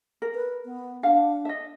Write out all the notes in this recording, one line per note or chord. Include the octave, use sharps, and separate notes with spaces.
A#4
B4
B3
D4 F5 F#5
D#5 E5